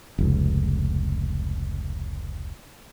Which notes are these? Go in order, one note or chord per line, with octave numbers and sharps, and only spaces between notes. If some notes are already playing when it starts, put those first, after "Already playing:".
F1 C#2